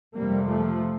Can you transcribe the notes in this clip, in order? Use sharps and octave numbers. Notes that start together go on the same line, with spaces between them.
F2 C3 G3 A#3
F3 A3